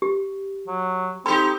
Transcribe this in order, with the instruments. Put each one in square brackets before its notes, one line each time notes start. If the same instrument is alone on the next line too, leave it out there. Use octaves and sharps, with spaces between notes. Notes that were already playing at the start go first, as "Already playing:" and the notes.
[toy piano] G4
[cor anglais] F#3
[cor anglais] C4 [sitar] D#4 G4 A4 [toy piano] B5